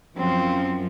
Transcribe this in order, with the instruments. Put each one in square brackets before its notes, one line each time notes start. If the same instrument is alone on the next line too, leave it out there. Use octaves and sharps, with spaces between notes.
[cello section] F#2 F3 [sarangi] C4